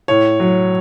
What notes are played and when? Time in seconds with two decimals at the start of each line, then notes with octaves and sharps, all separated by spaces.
0.08 A2 C#5
0.40 F#3